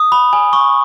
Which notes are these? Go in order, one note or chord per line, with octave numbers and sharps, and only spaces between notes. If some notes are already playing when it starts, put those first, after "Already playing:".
Already playing: D#6
B5
G#5
C#6